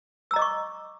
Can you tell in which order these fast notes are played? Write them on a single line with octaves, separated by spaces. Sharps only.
E6 A#5 D#5 D6 C#6